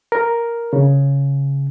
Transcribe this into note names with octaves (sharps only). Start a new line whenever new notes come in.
A#4
C#3